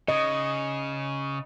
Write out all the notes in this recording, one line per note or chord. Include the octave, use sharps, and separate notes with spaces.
C#3 D#5